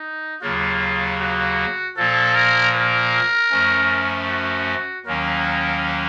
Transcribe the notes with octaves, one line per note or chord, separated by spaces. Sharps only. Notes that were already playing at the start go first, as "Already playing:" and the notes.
Already playing: D#4
D#2 C#3 F#3 A#3 F4
F#4
A#2 F3 A#3 A4
A#4
A#4
F#2 F3 A3 C#4
F#4
D#2 D#3 F#3 A#3 C#4 A#4